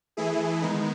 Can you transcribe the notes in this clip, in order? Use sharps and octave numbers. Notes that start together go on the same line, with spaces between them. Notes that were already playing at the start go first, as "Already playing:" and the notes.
E3 A3 E4 G#4
D#3 G#3 B3 D#4